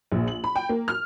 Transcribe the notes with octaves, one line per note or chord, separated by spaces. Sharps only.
A#1
F#7
B5
G5
A#3
F6